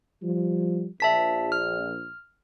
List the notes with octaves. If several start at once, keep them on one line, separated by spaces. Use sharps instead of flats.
F3 G3
A#1 E5 A5 B6
F6